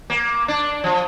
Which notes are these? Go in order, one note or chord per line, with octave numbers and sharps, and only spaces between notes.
A#3
D4
F3